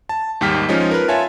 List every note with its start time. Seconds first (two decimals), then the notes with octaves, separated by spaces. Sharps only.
0.09 A5
0.41 D#2 G#2 G3 G5 F6 B6
0.69 F3 G#3 C#4 D#4
0.91 A#4 B4
1.08 F4 C#5 E5 G#5 A5